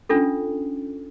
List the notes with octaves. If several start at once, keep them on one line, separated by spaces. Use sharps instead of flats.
C#4 D4 F4 A4